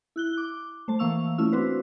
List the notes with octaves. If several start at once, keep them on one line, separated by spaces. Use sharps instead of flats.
E4 F#6 G7
D6
A3 C5 A5
E3 A#3 F5 C#6 E6 F7
A3 C#4 E4 F4 E6
C4 D4 F#4 B4 C5